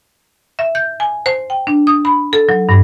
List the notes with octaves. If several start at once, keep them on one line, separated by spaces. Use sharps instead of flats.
E5
G6
G#5
C5
G5
D4
D#6
B5
A4
F#3
G2